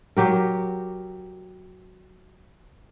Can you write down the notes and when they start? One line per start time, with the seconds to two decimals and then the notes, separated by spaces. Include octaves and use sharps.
0.17 F#3 G4 A#4